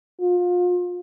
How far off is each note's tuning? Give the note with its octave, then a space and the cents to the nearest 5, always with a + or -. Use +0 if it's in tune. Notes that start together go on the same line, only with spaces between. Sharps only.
F4 +30